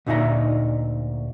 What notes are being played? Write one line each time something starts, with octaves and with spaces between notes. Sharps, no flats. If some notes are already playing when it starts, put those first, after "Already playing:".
D2 A#2 D#4 D5 E5 A#5